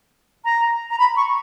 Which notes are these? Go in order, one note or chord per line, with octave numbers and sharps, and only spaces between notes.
A#5
A#5
B5
C#6